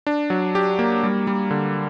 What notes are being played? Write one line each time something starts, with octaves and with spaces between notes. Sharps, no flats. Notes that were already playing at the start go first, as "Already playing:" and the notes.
D4
F#3
G4
A#3
G3
G3
D3